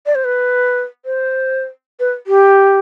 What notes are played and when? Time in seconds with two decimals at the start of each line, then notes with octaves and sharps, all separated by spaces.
0.06 D5
0.15 C5
0.24 B4
1.06 C5
2.00 B4
2.27 G4